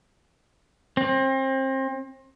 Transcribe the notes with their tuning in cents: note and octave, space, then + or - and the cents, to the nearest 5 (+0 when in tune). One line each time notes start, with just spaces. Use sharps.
C4 +30